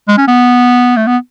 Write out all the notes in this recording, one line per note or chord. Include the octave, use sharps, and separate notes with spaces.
G#3
C#4
B3
A3
B3